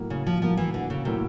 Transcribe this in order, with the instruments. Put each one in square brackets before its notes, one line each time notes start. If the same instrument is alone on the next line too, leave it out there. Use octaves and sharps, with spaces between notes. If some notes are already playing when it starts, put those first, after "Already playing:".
Already playing: [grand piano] A2 F#3 A#3
[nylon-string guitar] C#3
F3
[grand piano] A2 F#3 A#3 [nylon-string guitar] F3
[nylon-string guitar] E3
D3
C#3
[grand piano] A2 F#3 A#3 [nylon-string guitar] C3